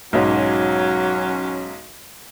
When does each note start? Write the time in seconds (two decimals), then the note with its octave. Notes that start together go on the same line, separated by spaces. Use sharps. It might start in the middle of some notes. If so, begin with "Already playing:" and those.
0.13 B1 G#2 F#3 C#4